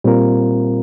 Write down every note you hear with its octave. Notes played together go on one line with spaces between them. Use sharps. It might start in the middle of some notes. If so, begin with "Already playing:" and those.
A#2 G3 C4 F4 A#4